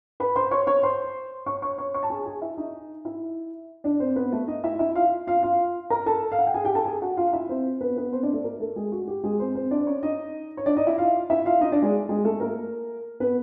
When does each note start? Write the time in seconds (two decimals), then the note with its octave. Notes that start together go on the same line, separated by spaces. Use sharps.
0.20 B4 B5
0.36 C5 C6
0.51 C#5 C#6
0.67 C#5 C#6
0.83 C5 C6
1.46 C#5 C#6
1.62 C#5 C#6
1.78 C#5 C#6
1.94 C#5 C#6
2.03 A5
2.10 G#4 G#5
2.26 G#4 G#5
2.42 E4 E5
2.57 D#4 D#5
3.05 E4 E5
3.84 D4 D5
4.00 C4 C5
4.16 B3 B4
4.32 A3 A4
4.47 D#4 D#5
4.64 E4 E5
4.79 E4 E5
4.95 F4 F5
5.27 F4 F5
5.43 F4 F5
5.90 A#4 A#5
6.06 A4 A5
6.32 F5
6.39 F#5
6.47 G5
6.54 G#4 G#5
6.65 G4 G5
6.75 A4 A5
6.86 G#4 G#5
7.02 F#4 F#5
7.17 F4 F5
7.33 E4 E5
7.49 C4 C5
7.81 B3 B4
7.97 B3 B4
8.12 C4 C5
8.23 D4 D5
8.33 A3 A4
8.44 A#3 A#4
8.60 A3 A4
8.76 G#3 G#4
8.92 F#4
9.08 G4
9.24 G#3 G#4
9.40 C4 C5
9.55 C4 C5
9.71 D4 D5
9.87 C#4 C#5
10.03 D#4 D#5
10.57 C#5
10.66 D4 D5
10.77 D#4 D#5
10.87 E4 E5
10.98 F4 F5
11.30 E4 E5
11.45 F4 F5
11.61 D#4 D#5
11.72 D4 D5
11.82 G#3 G#4
12.09 G#3 G#4
12.24 A3 A4
12.40 A#3 A#4
13.20 B3 B4